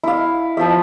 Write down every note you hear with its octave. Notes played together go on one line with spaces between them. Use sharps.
E4 F5
F3 F4 C5 E5